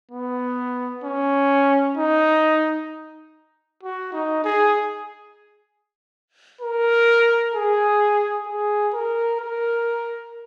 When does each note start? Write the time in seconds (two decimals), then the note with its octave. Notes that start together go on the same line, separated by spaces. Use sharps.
0.11 B3
1.04 C#4
1.97 D#4
3.83 F#4
4.13 D#4
4.45 G#4
6.61 A#4
7.54 G#4
8.46 G#4
8.94 A#4
9.40 A#4